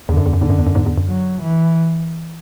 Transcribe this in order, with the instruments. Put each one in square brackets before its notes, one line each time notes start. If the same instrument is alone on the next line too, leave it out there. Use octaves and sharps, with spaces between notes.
[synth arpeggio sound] E2 [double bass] D3
[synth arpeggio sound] F#2
E2
F#2
[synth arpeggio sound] E2 G#2 [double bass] D3
[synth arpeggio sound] F#2
E2
F#2
E2 G#2
E2
F#2
[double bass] F#3
E3